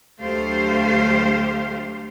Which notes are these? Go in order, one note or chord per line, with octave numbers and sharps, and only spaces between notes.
D2 F#3 A3 G4 C5 F5